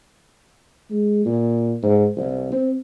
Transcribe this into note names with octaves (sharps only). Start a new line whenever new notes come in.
G#3
A#2
G#2
C2
C4